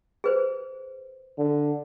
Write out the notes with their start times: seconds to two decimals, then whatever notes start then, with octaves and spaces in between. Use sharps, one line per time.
0.24 G#4 B4 C5
1.38 D3